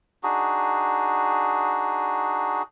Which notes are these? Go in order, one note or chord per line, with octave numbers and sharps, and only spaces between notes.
D4 D#4 F#4 G#4